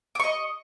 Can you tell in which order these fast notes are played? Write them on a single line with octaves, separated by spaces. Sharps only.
D6 C#6 D#5